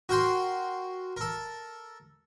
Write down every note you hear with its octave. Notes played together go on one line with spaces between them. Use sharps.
F#4 A#4 G5 C6
A4 A#4